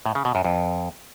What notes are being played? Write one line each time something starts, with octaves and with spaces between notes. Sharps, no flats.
A2
C#3
B2
F#2
F2